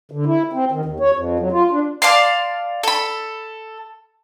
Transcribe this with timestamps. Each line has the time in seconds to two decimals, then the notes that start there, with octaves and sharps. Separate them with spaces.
0.11 D3
0.26 E4
0.53 C4
0.72 D#3
0.85 D#2
1.00 C#5
1.13 F2
1.39 F#3
1.52 F4
1.71 D4
2.02 D5 F5 A5 C6
2.83 A4 B5